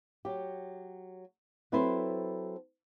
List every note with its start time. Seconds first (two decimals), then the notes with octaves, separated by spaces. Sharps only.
0.25 F#3 G4
1.72 F#3 C4 E4 A4 B4 C5